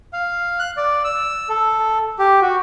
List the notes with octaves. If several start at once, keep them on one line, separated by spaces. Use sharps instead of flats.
F5
F#6
D5
E6
A4
G4
F#4